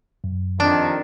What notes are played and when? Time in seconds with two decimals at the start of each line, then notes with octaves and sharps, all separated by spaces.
0.24 F#2
0.60 F2 C3 D#3 D4 A5